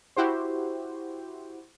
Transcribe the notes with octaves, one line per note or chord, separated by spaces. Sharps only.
E4 F#4 G4 C5